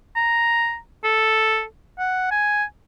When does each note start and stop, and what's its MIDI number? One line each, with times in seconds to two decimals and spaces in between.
0.16 0.77 82
1.04 1.64 69
1.99 2.30 78
2.31 2.64 80